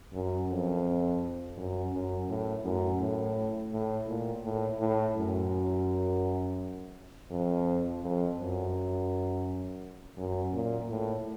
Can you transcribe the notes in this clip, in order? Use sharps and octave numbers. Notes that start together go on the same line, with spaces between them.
F#2
F2
F#2
F#2
A2
F#2
A2
A2
A#2
A2
A2
F#2
F2
F2
F#2
F#2
A#2
A2